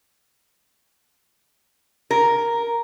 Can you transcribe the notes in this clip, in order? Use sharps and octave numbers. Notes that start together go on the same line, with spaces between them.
A#4